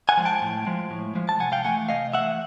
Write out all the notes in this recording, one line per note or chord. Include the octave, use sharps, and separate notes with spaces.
F#5 G#5
F3 G#3
G5 A5
A2
F3 G#3
A2
F3 G#3
A5
C3 F#5 G#5
F5 G5
E3 A3 F#5 G#5
C3 D#5 F5
E3 A3 E5 F#5